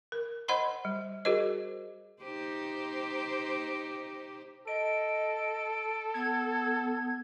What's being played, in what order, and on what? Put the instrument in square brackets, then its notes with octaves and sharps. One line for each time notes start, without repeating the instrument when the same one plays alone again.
[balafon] A#4
C5 D#5 F#5 B5 C6
G3
F#4 G#4 A#4 C5 D#5
[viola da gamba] D#4 G4 C5
[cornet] A4 [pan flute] D#5 [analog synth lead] D7
[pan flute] B3 [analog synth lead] G#6